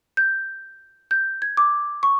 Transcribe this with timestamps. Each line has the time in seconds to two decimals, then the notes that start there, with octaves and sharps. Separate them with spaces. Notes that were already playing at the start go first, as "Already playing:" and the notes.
0.17 G6
1.11 G6
1.42 G#6
1.57 D6
2.03 C#6